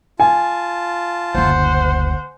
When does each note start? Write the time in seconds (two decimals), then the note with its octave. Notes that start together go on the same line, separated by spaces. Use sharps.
0.20 F4 G#5 A5
1.35 F#1 D2 C5 F#5